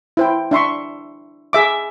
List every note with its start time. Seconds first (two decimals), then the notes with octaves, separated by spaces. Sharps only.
0.17 E4 C5 G5
0.51 D4 E5 C6 C#6
1.53 G#4 E5 D6